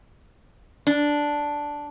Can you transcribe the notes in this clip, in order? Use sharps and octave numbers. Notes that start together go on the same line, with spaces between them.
D4